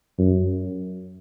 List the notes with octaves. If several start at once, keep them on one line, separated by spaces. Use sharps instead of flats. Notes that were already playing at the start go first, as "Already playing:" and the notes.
F#2